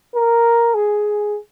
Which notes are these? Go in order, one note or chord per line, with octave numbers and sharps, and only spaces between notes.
A#4
G#4